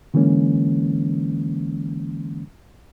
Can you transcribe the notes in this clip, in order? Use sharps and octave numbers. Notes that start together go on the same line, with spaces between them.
D3 E3 G#3 A#3 C#4